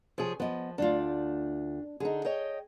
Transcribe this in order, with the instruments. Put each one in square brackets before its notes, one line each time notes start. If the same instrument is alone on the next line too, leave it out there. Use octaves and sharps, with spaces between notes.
[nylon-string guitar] C3 C#5 [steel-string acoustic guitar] F3 G#4
[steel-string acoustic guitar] F3 [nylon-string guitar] B3 D#5
[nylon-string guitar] D2 A3 F4 [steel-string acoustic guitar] D4
[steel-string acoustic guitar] D3 D#4 [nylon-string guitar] G#4
[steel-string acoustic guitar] C#5 D#5 G5